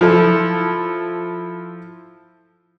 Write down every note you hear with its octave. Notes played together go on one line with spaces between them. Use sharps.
F3 E4 A4